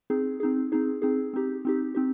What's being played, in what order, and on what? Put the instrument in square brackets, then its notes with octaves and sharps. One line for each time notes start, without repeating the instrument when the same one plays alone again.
[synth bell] C4 D#4 G#4
C4 D#4 G#4
C4 D#4 G#4
C4 D#4 G#4
C4 D#4 G4
C4 D#4 G4
C4 D#4 G4